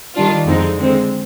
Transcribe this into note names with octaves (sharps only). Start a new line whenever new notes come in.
D#3 G3 D4 F4
F2 D3 G#3 C4 D#4
D3 G#3 C4